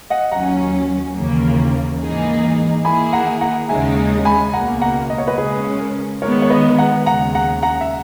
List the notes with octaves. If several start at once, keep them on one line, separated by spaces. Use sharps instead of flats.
D#5 F#5
D#2 D#3 F#3 C#4 F#5 A#5
D#2 C#3 E3 A#3
G#2 E3 A#3 D#4 G#4
D#3 A#3 E4 G#4 G#5 B5
F#5 A#5
F#5 A#5
D#2 C#3 G#3 D#4 E5 G#5
G#5 B5
C#2 B2 A#3 F#5 A#5
F#5 A#5
D#5
C#5
B4 D#5
C#3 G#3 C#4 G#4 B4
A#4
D#3 G#3 B3 A#4 C#5
C#5
B4 D#5
F#5 A#5
D#2 C#3 G#3 F#5 A#5
F#5 A#5
F#5 A#5
E5